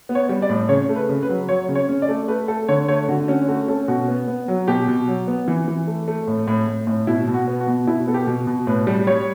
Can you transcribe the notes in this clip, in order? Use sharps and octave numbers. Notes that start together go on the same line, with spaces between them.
B3
C#5
G3
D5
A2
C#3 C#5
A3
B4
C#3
B4
F#3
F#3 C#5
C#3
C#5
C#4
D5
A3
A3 B4
A3 A4
D3 C#5
A3 C#5
D3 F#4
C#4 F#4
A3 F#4
C#4 A4
B2 F#4
B3
B3
F#3
B2 G4
B2
F#3
B3
E3
E3
A3
A3
A2
A2
A2
A2
B2 E4
B2
F#4
B3
F#4
B2
B2 E4
B3 A4
G4
B2
B2
A2 B4
G3
G3 C#5